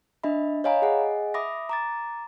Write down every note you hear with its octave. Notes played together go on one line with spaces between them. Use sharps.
D4 D#5 E5 B5
C#5 D#5 F5 G#5 A#5 B5
G#4 D#5 F#5 G#5
E5 B5 D6 D#6 A#6
A#5 D6 A6